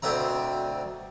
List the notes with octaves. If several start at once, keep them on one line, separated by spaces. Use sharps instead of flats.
D2 B2 C4 E5 A#5